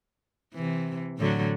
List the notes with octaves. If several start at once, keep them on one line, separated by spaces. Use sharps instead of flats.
C3 E3
A2 D3 F#3